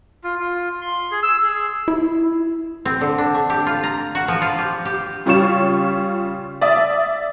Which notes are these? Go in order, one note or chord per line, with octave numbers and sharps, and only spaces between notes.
F4
F4
C6
G#4
E6
G#4
E4
C4
D3
D4
A3
G4
F4
A#5
F#4
F3
F4
G4
G4
C#3 G3 F4 C#5 C#6 E7
D5 E5 D#6